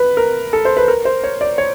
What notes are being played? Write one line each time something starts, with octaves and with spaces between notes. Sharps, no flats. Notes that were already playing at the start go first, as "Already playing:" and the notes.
Already playing: B4
A#4
A4
C5
B4
A#4
C5
C#5
D5
C#5